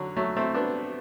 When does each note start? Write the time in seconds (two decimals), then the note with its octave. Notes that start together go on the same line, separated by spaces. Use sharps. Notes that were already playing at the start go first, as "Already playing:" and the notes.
Already playing: D3 F#3
0.16 F#3 A3
0.37 A3 C4
0.54 B3 D4